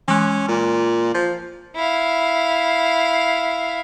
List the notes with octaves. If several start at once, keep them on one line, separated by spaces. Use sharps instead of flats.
E3 G#3 C#4
A#2
F3
E4 F5